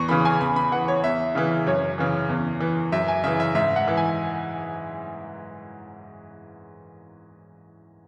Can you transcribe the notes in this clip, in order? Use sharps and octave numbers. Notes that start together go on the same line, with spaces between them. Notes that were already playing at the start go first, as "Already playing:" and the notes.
Already playing: E2 C#6
C#3 E3 B5
G#5
E2 B5
B5
E3 F#5
C#5
E2 E5
C#3 E3
F#2 C#5
C#3 E3
E2
E3
F#2 E5
G#5
C#3 E3 E5
E5
G#2 E5
F#5
E3
G#5